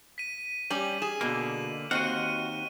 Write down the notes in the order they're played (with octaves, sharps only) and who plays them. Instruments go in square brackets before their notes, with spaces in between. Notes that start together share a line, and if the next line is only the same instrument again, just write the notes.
[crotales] B6 D#7
[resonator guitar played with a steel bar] G3 C#4 G4 [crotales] F#7
[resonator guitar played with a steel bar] G#4 [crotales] E7
[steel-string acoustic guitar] B2 D#4 [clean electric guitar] D3 A#3
[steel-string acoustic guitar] D#2 D#4 [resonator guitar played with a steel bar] C4 [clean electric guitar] F#4 F#5 [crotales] F6 D#7